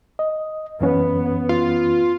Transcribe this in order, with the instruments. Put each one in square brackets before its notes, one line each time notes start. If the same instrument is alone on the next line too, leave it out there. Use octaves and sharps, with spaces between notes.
[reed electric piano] D#5
[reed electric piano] F#2 E3 C#4 [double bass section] B3
[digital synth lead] F4